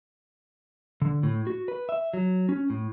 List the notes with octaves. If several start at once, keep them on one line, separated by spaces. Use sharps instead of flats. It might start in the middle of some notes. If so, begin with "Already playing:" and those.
D3
A2
F#4
B4
E5
F#3
C#4
A2